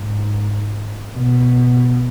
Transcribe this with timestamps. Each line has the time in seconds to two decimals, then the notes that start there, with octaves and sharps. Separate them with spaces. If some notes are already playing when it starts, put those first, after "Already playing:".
Already playing: G#2
1.14 B2